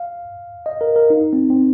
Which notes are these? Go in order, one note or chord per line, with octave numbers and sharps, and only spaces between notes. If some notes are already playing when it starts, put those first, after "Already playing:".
Already playing: F5
D#5
A#4
A#4
D#4
C4
C4